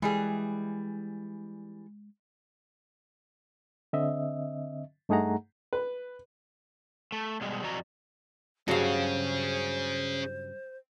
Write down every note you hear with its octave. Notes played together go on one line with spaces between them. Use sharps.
E3 G3 G#3 G#4
D3 C4 D#5 E5
G2 A3 D#4 G#4 F#5 A#5
B4
A3
B2 G3 G#3
F2 F#4 D5 D#5 A#5
G2 C#3 F#3 C#4 F#4 G#4 C5 F5